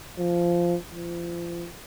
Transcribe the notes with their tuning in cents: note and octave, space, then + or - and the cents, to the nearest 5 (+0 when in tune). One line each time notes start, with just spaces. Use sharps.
F3 -10
F3 -30